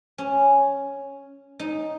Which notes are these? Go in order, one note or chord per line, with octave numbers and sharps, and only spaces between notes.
C#4
D#4